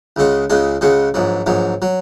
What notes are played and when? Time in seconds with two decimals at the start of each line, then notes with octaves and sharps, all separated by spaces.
0.16 C#2 C#3 G#3 F#4
0.50 C#2 C#3 G#3 F#4
0.81 C#2 C#3 G#3 F#4
1.14 A#1 G#2 F#3
1.46 A#1 G#2 F#3
1.82 F#3